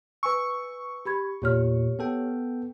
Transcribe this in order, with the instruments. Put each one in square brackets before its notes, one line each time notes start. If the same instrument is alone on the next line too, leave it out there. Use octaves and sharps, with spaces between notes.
[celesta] B4 G#5 E6 [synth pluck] C#6
[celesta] G4 B5 G#6
[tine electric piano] E2 A#2 [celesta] G4 C#5 F6
[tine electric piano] B3 A4 G5